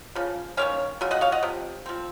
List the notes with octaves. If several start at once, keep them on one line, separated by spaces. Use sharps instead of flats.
C#3 F3
D#3 A#3 C#4 C#5 F5
C#3 F#3
D#5 F#5
C#5 F5
D#5 F#5
C3 F3
F3 C4